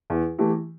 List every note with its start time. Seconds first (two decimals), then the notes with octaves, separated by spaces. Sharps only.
0.10 E2
0.39 E3 A3 G4